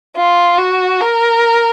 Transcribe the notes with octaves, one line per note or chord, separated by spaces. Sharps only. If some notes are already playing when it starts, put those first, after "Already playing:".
F4
F#4
A#4